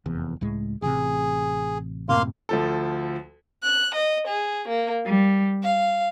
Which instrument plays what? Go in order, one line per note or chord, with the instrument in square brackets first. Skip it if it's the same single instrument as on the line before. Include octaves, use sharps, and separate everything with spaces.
[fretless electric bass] F1 E2
C#2 A2 G#3
[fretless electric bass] A1 C3 [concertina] G#4
[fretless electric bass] F#2 A2 C3 [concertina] A#3 F5 C6
[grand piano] D2 F3 A4
[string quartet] F#6
D#5
G#4
A#3
G3
F5